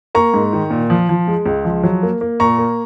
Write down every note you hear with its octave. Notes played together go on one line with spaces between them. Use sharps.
A#3 A#5 C#6
G#2
D#3
A#2
F3
F3
G#3
C#2
F3
F#3
A#3
A#3
A#2 A#5 C#6
A#3